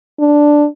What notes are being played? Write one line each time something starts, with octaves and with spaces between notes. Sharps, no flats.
D4